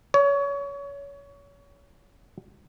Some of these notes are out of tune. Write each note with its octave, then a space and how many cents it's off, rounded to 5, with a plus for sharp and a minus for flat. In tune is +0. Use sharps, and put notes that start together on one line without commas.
C#5 +25